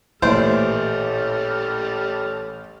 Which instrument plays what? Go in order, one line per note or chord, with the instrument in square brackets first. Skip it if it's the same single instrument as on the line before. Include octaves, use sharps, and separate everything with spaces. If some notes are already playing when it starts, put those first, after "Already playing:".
[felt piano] A1 [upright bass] A#2 [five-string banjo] E3 D4 C5 [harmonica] G3 A4 F6